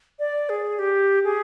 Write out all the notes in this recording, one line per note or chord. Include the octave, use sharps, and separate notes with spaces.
D5
G#4
G4
G#4